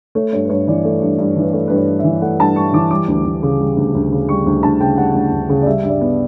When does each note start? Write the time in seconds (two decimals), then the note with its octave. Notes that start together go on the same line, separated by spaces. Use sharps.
0.15 A3 C#5
0.33 G2 C#5
0.45 B4
0.50 G2 C#5
0.68 E3 D5
0.85 A3
1.02 G2
1.19 G2
1.36 E3
1.42 B4
1.53 A3 C#5
1.68 G2 B4
1.76 C#5
1.88 G2
1.99 E5
2.04 E3
2.21 A3 F#5
2.39 G2 A5
2.56 G2 C#6
2.73 E3 D6
2.91 G3 D6
3.08 D2
3.25 D2
3.43 C#3
3.60 G3
3.77 D2
3.95 D2
4.12 C#3
4.29 G3 C#6
4.46 D2
4.63 D2 A5
4.80 C#3 G5
4.97 G3 F#5
5.15 D2
5.32 D2
5.49 C#3
5.62 D5
5.66 G3 E5
5.83 G2 E5
5.89 D5
6.01 B3